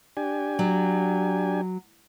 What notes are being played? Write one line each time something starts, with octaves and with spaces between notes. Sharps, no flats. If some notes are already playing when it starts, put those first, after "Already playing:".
D4 G4 G#5
F#3